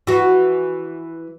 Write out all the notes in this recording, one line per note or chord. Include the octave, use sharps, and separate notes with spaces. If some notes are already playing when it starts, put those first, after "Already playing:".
E3 F#4